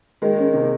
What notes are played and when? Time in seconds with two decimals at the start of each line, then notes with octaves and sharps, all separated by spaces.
0.22 D#3 G#3
0.38 C#4
0.54 C3